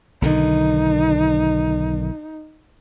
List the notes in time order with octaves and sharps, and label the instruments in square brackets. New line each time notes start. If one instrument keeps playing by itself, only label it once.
[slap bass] B1 D3 D#3 [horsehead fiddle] D#4